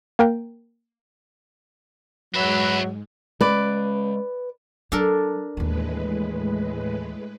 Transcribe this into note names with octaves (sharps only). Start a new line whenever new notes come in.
A#3 A#4 G5
G#2 F#3 G#3 F#4 B4 E5
G#3 C#4 B4 D5
F#3 D4 A4 A#4
D#2 A2 E3 G#3 B4